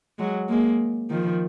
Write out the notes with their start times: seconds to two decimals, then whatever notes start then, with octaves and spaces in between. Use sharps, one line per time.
0.19 F#3 G#3
0.49 G#3 A#3
1.10 D#3 F3